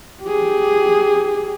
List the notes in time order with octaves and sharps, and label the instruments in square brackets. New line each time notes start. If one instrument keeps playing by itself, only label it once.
[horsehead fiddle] G4 G#4